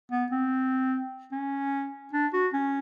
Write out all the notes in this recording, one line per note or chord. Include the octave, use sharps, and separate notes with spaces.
B3
C4
C#4
D4
F#4
C#4